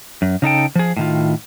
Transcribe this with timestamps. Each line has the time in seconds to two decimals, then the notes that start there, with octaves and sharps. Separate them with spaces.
0.22 F#2
0.42 C#3 D#4 A4 G5
0.75 F3 G#4
0.97 A2 D#3 F4